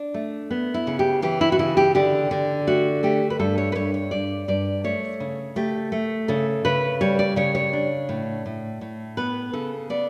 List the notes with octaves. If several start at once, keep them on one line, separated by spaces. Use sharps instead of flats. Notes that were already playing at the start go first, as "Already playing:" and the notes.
Already playing: D4
A3
B3
E4
C#3
G4
E3 G4
E4
F#4
C#3 E4
G4
D3 G4
D3
A3 F#4
A3 G4
B4
G2 A4
C#5
B4
G2 C#5
C#5
G2 D5
G2 D5
A3 C#5
C#3
A3 G4
A3
C#3 A4
C#3 B4
G3 C#5
D5
C#3 C#5
C#5
D4
A2
A2
A2
B3 B4
C#3 A4
B3 D5